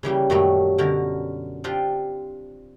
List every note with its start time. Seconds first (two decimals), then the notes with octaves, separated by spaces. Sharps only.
0.03 C#3 E3 G3 A#3
0.30 F#2 A#2 D#3 F#3 G3 A3
0.78 B2 D3 C#4 A#4
1.64 C4 D4 F4 G4